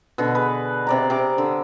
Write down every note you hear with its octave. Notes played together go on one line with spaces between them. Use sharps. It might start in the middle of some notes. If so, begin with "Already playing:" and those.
B2 D3
G#4 B4
C3 D5 A#5
C3 A#5 D6
D3